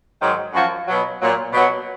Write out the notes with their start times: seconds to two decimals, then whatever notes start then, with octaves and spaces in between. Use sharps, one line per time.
0.21 G#2 D#3 F#3
0.53 F#2 F3 F#4
0.87 B2 F#3
1.20 A#2 F#3
1.53 B2 F#3